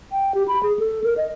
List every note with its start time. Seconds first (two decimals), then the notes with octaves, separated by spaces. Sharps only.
0.12 G5
0.35 G4
0.48 B5
0.63 G#4
0.79 A4
1.04 A#4
1.17 D#5